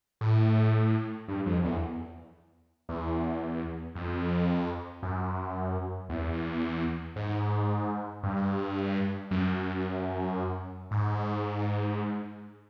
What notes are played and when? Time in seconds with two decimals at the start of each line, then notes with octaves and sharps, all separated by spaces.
0.21 A2
1.28 G2
1.46 F2
1.64 E2
2.89 E2
3.95 F2
5.03 F#2
6.09 E2
7.16 G#2
8.23 G2
9.31 F#2
10.91 G#2